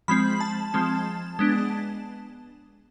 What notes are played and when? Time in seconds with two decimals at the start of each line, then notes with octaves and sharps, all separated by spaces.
0.08 F3 G#3 C4 B5
0.41 A5
0.74 F3 G#3 C4
1.39 G#3 B3 D4